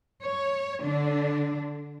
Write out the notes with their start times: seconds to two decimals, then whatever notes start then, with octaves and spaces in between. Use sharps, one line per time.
0.23 C#5
0.82 D3 D4